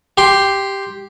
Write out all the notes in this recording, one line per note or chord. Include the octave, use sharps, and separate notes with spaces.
G4 C6